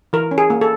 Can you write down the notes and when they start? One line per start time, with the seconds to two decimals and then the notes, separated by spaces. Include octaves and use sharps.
0.13 E3 A#4
0.31 C#4
0.38 G#4
0.50 A#3
0.61 A4